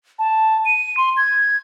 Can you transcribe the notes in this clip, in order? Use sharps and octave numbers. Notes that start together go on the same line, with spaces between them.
A5
D#7
C6
G#6